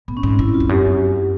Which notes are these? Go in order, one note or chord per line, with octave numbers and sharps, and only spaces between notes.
A2 B3
C#4
G#2 C4
G2 E4
F4
F2
F#2 G4